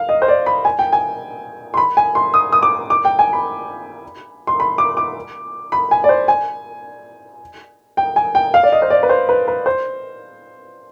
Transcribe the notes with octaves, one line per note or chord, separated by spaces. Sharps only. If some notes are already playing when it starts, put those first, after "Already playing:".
Already playing: F5
D#5
C5
D5
B5
G#5
G5
G#5
C6
B5
G#5
C6
D#6
D#6
D6
D6
G5
G#5
B5
C6
B5
D6
D6
B5
G#5
D5
C5
G#5
G5
G#5
G5
F5
D5
D#5
C5
D5
B4
C5
B4
B4
C5